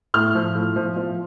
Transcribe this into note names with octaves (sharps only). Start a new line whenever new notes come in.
A2 F6
F3
A2
F3
F3